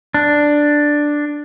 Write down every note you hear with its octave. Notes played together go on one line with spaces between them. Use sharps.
D4